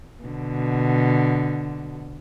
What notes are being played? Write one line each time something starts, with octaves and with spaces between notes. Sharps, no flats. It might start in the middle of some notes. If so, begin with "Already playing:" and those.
B2 D3